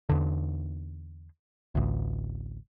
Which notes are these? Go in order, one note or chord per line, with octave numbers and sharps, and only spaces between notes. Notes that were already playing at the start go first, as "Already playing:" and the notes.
E2 D3
A1 D2